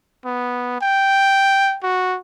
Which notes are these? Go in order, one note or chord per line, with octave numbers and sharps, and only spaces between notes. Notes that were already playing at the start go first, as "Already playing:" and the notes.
B3
G5
F#4